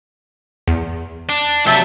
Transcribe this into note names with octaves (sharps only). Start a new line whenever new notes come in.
E2
D4
C3 F#3 E5 A5 G6